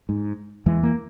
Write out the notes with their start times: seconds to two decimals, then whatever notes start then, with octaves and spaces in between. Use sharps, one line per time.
0.09 G#2
0.66 E2 E3 G#3
0.83 A#3